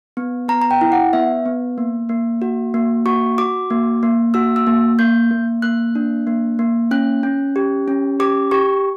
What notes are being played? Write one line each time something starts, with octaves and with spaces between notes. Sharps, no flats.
B3
B3 A#5
A#5
G5
E4
F#5
B3 E5
B3
A#3
A#3
F#4
A#3
F#4 C#6
F#4 D6
A#3
A#3
F#4 E6
E6
A#3
A#3 G6
A#3
A#3 F#6
D4
A#3
A#3
C#4 F#6
C#4
G4
C#4
G4 D6
G4 C#6